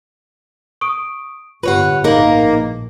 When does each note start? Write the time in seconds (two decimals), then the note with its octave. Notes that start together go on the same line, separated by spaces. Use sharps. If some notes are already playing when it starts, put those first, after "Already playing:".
0.81 C#6 D#6 D7
1.63 G1 A2 F4 G4 B4 C#5 F#5
2.04 A#1 A2 A#3 D#4 G#4 A#4 F#7